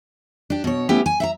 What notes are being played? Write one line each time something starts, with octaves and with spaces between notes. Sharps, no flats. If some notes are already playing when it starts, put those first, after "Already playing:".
D4 G4
B2 C#5
A3 B3 C#4 E4 G4 A4
G#5
E5 F#5 A#5